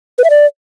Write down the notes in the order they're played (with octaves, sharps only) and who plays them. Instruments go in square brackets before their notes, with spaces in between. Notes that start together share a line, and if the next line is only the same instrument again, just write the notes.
[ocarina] B4
E5
D5